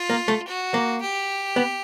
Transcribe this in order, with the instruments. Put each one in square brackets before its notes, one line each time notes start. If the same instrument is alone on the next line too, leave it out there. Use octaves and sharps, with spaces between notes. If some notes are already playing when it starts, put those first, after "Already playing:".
Already playing: [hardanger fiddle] F4
[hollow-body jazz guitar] A#3
A3
[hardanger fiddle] F#4
[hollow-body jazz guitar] A#3
[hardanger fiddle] G4
[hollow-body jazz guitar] B3